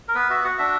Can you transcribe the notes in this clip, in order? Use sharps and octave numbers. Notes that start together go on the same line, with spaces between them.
A#4
B3 B4
F#4 E5
F#4 F#5
D4 E5